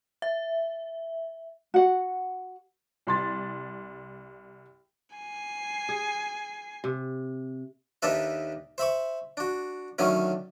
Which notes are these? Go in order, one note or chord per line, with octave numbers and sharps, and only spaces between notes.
E5
F#4 F#5
C2 C6 A6
G#5 C7
G#4
C3
D#2 D4 D#4 A4 B4 E5
C5 E5 B5 C#6
D4 F#4
D3 D#3 F#3 A3 C#4